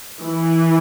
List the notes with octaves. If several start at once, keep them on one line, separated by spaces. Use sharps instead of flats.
E3